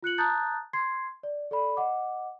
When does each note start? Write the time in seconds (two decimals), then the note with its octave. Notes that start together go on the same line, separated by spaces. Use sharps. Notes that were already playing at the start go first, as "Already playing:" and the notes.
0.03 F4 F#6 C#7 F#7
0.18 A5 A#5 D#6 F#6 G6 A6
0.73 C6 G#6 C7
1.23 D5
1.51 A4 D5 B5
1.77 D#5 F#5 D6